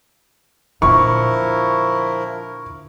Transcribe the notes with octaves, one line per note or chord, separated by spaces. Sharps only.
A#2 D3 F3 E4 A#4 C#6